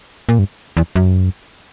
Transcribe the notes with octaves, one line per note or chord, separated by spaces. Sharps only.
A#2
G2
E2
F#2